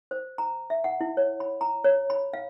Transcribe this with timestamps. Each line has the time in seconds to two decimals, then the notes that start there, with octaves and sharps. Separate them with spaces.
0.11 C5
0.38 A#5
0.70 E5
0.84 F#5
1.01 E4
1.17 C#5
1.40 B5
1.61 A#5
1.84 C#5
2.10 B5
2.33 F5